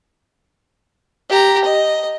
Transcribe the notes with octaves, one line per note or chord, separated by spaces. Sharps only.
G4 A#5
D#5